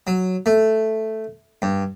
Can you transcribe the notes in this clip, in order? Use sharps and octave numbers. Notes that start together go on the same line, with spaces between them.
F#3
A3
G2